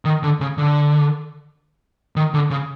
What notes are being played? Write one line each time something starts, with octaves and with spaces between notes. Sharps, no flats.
D#3
D3
C#3
D3
D#3
D3
C#3